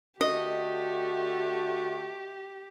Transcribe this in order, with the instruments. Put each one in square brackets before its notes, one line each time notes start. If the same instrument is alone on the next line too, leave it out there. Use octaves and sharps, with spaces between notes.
[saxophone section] D3 A3 F#4 [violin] G4 [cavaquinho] D#5